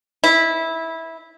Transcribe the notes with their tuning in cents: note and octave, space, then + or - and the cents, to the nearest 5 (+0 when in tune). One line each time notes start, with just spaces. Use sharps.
E4 -15